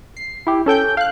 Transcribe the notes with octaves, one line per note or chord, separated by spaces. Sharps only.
C7
E4 G4
C#4 A4 G5 G6
F5 F#6